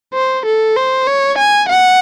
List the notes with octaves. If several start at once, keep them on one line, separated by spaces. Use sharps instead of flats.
C5
A4
C5
C#5
G#5
F#5